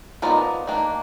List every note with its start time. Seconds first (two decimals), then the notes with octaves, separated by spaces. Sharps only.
0.22 F3 B3 D#4 A#4 D5
0.67 D#3 A#3 D4